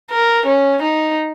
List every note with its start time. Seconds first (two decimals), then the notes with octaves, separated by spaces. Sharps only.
0.10 A#4
0.46 C#4
0.82 D#4